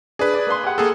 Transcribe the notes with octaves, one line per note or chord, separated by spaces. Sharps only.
D4 G#4 B4 D5
D5
A#3 C6
G4 F#5
A#3 G#4 A4